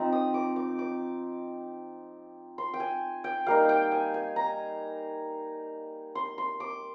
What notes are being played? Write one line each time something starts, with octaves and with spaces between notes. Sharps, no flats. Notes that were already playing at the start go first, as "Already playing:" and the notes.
Already playing: F3 C4 D#4
D#6
D6
D6
D6
C6
G5
G#5
G5
G3 A#3 D#4 F5
G5
G#5
G#5
A#5
C6
C6
D6